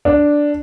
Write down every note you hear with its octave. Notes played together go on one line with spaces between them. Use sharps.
D4